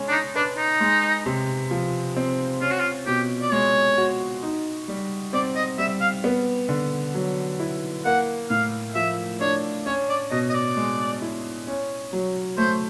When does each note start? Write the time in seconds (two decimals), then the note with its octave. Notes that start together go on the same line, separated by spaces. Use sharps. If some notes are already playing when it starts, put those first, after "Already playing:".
Already playing: G#3 C#4
0.09 D4
0.12 D#4
0.36 D4 B4
0.57 D#4
0.80 G#3
1.26 C3
1.71 F3
2.16 C4
2.61 C#4 F4
2.70 F#4
2.79 F4
3.06 B2 G4
3.42 D5
3.52 G#3 C#5
3.98 F#4
4.43 D#4
4.88 G3
5.33 C4 D5
5.56 D#5
5.78 G3 E5
6.01 F5
6.24 B3
6.69 D3
7.15 F#3
7.60 E4
8.05 A#3 F#5
8.50 A2 F5
8.95 F3 E5
9.41 D4 C#5
9.86 C#4 C#5
10.09 D5
10.31 B2 D#5
10.50 D#5
10.54 D5
10.77 G#3
11.22 E4
11.67 C#4
12.13 F#3
12.57 A3 C5